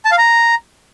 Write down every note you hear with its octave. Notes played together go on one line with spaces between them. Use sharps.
A5
F5
A#5